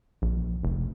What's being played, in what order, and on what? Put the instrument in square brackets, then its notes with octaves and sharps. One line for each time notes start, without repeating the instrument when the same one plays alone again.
[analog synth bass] A#1
F1